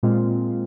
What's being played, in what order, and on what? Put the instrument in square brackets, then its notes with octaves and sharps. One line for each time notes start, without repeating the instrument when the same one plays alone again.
[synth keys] A#2 G#3 C4 F4